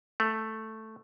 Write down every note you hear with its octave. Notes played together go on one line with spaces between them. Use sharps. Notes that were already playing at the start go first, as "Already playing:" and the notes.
A3